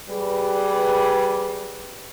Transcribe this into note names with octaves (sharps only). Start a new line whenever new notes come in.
G3 G#4 B4